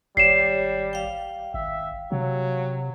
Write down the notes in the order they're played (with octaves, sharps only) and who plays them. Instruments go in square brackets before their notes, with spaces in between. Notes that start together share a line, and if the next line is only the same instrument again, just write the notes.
[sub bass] G#1 [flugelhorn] G3 [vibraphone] C#5 [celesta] C7 E7
[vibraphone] F5 G5
[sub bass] G#1 [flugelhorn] E5
[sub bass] C3 [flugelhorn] F#3